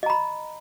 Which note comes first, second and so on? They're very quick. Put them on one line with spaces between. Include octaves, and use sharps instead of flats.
D#5 A#5 B5